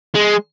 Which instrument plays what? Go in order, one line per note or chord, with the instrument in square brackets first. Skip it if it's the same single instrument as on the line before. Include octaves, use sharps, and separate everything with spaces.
[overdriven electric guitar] G#3